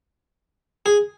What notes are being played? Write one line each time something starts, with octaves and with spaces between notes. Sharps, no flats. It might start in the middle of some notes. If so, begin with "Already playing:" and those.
G#4